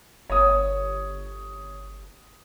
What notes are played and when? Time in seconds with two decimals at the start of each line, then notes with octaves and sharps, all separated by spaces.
0.30 G1 C#5 D#6